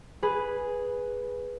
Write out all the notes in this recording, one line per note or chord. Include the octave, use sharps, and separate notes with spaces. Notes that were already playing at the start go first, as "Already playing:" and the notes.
G#4 B4